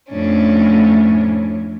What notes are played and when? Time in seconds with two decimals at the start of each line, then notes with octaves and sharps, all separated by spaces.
0.11 F2 A2 C#4 D4